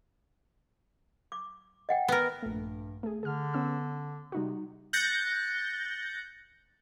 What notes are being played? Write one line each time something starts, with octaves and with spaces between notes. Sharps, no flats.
D6
D#5 F#5 G5
B3 A#4
A#1 G2 A3
A3 G#4
D3 G#4 F6
B3 C#4 E6
C3 G3 D#4 F#4
F#6 G6 A6 A#6 C#7